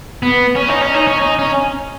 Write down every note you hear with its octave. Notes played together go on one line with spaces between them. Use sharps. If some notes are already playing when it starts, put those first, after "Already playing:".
B3
C#4
D#4
C#4
D#4
C#4
D#4
C#4